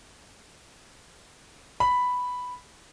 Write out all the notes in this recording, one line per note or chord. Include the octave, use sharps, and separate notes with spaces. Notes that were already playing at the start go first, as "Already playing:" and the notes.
B5